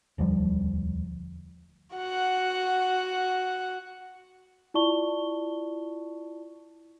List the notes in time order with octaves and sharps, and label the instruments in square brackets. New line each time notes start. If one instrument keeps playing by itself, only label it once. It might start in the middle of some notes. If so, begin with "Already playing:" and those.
[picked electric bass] E1 D2 F3 G3
[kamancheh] F#4 F#5
[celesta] E4 F4 D5 A5 C#6 G7